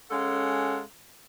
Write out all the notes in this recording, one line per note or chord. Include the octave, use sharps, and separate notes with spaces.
G#3 C#4 A4 F5 F#5